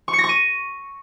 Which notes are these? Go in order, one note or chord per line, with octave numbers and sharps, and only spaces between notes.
C#6
C#7
A#6
C#6
D#7